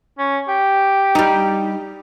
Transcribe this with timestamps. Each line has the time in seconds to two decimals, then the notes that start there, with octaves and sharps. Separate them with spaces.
0.18 C#4
0.48 G4
1.15 G3 D#4